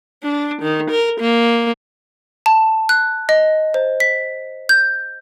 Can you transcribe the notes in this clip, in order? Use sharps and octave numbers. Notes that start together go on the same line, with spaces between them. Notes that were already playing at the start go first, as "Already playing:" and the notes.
D4
D#3
A#4
A#3
A5
F#6
D#5
C5
B6
G6